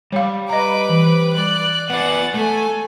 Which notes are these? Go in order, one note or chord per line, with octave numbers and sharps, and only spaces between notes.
G3 C#5 F5
B4 D#5 A#5 D6
E3
D5 F#6
B3 D5 F#5 A6
A3 A4 G#5